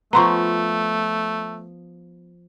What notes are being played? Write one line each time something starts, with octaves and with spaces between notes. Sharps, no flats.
F3 A3 B3 A#5 C6 C#6